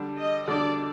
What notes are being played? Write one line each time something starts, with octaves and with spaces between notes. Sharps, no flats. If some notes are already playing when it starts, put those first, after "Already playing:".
Already playing: D3 G3 D4
D#5
D3 G3 D4 D5